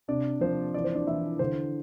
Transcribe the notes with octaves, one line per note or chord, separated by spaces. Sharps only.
C3 D4 D5
F3 C5
E3 D5
C5
D4 D5
E3 E4 E5
D3 C5